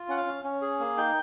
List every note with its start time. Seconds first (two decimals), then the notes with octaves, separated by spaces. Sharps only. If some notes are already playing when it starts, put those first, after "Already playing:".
Already playing: F4
0.08 C#4 F#5
0.17 F5
0.26 C#4
0.44 C#4
0.62 G#4
0.80 A#3
0.97 D#4 G5